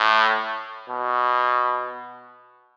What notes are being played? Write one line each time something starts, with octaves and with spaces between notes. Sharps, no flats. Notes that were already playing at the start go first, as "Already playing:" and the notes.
Already playing: A2
B2